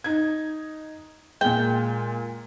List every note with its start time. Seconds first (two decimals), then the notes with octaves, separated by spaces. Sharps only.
0.04 D#4 G#6
1.41 A#2 G#3 G5